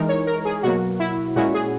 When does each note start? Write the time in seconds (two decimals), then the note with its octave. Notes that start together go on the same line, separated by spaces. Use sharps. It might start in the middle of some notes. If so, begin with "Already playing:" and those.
Already playing: E3 G#3 D#4 A#4
0.09 C#5
0.27 A#4
0.45 G#4
0.63 B2 F#3 A#3 F#4
1.00 E4
1.36 A#2 G#3 C#4 E4 F#4
1.54 G#4